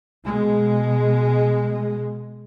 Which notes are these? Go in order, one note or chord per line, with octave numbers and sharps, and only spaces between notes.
B2 G#3